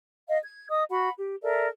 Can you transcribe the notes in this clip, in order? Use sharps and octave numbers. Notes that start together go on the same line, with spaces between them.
D#5 F5
G#6
D#5 D#6
F#4 F#5 B5
G4
A4 A#4 D5 E5